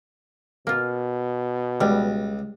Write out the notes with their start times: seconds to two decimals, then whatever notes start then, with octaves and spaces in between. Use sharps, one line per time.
0.67 B2 A#3 F4
1.81 C#2 G3